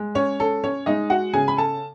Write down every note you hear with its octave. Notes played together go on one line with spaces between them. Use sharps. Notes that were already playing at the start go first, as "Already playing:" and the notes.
Already playing: G#3
C#4 C#5
C#4 A4
C#4 C#5
G#3 D#4 D#5
F#4 F#5
C#3 G#4 G#5
B5
A4 A5